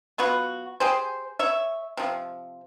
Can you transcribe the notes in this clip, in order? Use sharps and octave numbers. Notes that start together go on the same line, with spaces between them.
F#3 B3 F4 F#4
G4 G#4 C5
C#5 E5
C3 F3